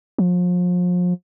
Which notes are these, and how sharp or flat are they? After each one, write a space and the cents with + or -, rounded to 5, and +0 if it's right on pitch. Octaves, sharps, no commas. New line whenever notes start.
F3 +35